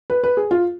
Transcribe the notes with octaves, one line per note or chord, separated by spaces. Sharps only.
B4
B4
G#4
F4